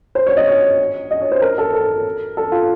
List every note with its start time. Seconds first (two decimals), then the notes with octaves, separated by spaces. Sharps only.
0.15 C5
0.27 C#5
0.37 D#5
0.48 C#5
1.11 D#5
1.21 C#5
1.32 C5
1.42 A#4
1.58 A4
1.73 A#4
2.37 A4
2.52 F4